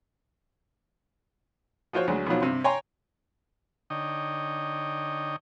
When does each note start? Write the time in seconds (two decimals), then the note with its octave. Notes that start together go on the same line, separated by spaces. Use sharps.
1.93 F3 F4 F#4 C5 C#5
2.07 D2 F#3 G#3
2.27 B2 D#3 F3 F#3
2.42 G2 C3
2.64 C#5 G5 G#5 A#5 C6
3.90 D3 D#4 C#5 D#5 G5